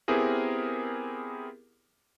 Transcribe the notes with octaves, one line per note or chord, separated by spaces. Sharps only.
B3 C4 E4 G4 G#4 A#4